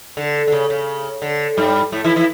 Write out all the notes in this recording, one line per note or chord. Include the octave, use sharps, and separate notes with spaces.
D3
D3
C#3
C#3
D3
G2 G3
A2 A3
E3 E4
E3 E4